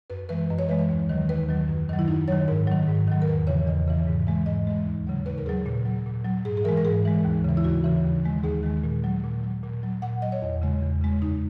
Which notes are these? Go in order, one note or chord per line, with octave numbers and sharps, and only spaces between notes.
F#2 B4
E3 G#3 B4
F#2 D#5
C#5
E3 G#3 B4
C#5
D#2
D#3 F#3
D#2 B4
D#3 F#3
F#2
D#3 F#3
E4
F#2 D#4
D#3 F#3 C#5
G#2 A#4
D#3 F#3
G#2
D#3 F#3
A#4
E2 B4
C#3 E3 C#5
E2 D#5
C#3 E3
G#2
E3 G#3
G#2 D#5
E3 G#3
D#2
C#3 F#3
D#2 B4
A#4
C#3 F#3 G#4
A#2
F#3
A#2
F#3
G#2 G#4
G#4
E3 G#3 A#4
A#4
G#2 G#4
E3 G#3
D#2
C#3 E3
E4
D#2 F#4
C#3 E3
D#2
D#3 G#3
D#2 G#4
D#3 G#3
A#2
F#3
A#2
F#3
A#2
F#3
A#2 F#5
F#3 D#5
C#5
E2
C#3 G#3
E2
C#3 G#3
F#2 D#4